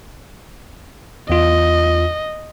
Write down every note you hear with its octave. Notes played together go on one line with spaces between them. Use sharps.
E2 F4 D#5